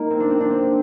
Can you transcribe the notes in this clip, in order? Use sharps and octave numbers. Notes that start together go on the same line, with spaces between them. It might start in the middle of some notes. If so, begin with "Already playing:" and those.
Already playing: A#3 D#4 F4
C4
D4
C4
D4
C4